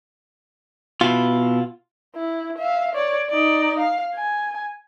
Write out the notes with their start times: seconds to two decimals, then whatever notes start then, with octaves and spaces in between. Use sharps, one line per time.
1.01 B2 E4 F4
2.15 E4
2.58 E5 F5
2.95 C#5 D5
3.30 D#4 D5
3.79 F5
4.15 G#5